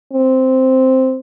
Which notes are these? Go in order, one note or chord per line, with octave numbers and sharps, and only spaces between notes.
C4